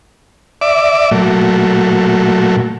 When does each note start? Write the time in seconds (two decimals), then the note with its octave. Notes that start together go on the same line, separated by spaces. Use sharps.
0.61 D5 E5 D6
1.11 A#2 F#3 A3